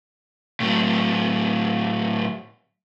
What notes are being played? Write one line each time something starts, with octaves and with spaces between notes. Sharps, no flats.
A2 F#3